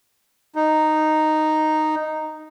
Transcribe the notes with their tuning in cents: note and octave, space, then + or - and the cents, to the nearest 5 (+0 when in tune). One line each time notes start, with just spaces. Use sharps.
D#4 -5